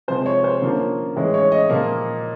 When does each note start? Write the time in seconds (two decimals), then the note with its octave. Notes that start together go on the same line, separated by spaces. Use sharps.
0.08 C3 F3 G#3 C5
0.26 C#5
0.44 C5
0.62 D3 F3 A#3 C#4
1.16 A2 E3 G#3 C#4
1.34 C#5
1.52 D#5
1.70 A#2 F3 A#3